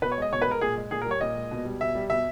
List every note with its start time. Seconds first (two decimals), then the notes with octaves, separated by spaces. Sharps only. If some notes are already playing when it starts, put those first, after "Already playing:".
0.02 B2 B4
0.12 C#5
0.18 G#3 D#5
0.32 B2 C#5
0.42 B4
0.47 G#3 A#4
0.61 A#2 G#4
0.77 G#3
0.91 A#2 G#4
1.02 A#4
1.06 G3 C#5
1.21 A#2 D#5
1.35 G#3
1.51 B2
1.65 G3
1.81 B2 E5
1.95 G3
2.10 B2 E5